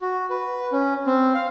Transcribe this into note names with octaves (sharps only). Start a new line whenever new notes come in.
F#4
B4
C#4
C4
F5